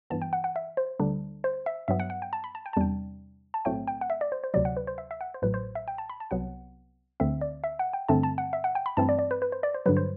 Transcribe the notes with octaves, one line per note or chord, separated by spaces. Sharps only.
G2 E3 B3 A5
G5
F#5
F#5
E5
C5
D2 D3 G3 D4
C5
E5
G2 F#3 B3 E5
F#5
F#5
G5
A5
B5
A5
G5
A5
E2 C3 G3 D4 G5
A5
B1 A2 F#3 A3 C4 G5
G5
F#5
E5
D5
C5
C5
D2 C3 F#3 D5
F#5
B4
C5
E5
E5
F#5
C5
A1 A2 F#3 B4
C5
E5
G5
A5
B5
A5
C2 C3 F#3 B3 F#5
D2 D3 A3 C4 E5
D5
E5
F#5
G5
G2 D3 A3 C4 A5
A5
F#5
E5
F#5
G5
B5
G2 E3 A3 C4 A5
D5
D5
B4
B4
C5
D5
C5
G2 D3 F#3 B4
C5